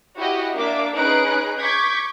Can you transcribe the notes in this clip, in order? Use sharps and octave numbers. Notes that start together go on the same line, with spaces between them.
E4 F#4 G4 D#5
A#3 D4 E5 D6
C#4 D#4 G#4 B4 F#6 D7
C#6 D6 G6 G#6 B6